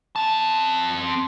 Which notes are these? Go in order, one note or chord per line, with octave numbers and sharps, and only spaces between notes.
C4 A5